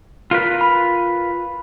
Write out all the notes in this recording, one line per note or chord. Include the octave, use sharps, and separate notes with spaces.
F4 A#4 B4
B5